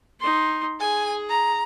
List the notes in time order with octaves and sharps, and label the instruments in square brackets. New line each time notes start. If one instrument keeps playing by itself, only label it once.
[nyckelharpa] D#4 C6
[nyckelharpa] G#4 [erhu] G#5
[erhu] A#5